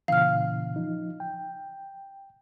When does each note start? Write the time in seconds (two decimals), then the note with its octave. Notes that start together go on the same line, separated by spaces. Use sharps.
0.08 A#2 C#3 E3 F5 F6
0.76 F3 D#4
1.20 G5